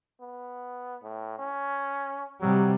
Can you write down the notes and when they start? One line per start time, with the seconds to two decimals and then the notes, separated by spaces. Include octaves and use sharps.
0.21 B3
1.03 A2
1.38 C#4
2.41 C3 F#3 G3